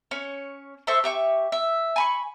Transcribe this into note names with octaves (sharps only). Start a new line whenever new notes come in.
C#4 C#5
A4 C5 E5 C#6
G4 E5 C#6
E5
G#5 B5 C#6